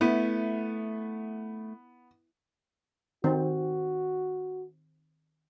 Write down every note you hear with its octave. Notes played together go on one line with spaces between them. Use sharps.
A3 B3 E4
D#3 C4 F#4